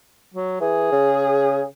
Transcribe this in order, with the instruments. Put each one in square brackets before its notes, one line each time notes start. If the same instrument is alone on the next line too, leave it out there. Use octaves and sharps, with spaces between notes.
[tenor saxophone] F#3
[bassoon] E3 [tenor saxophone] G#4
[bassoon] C#3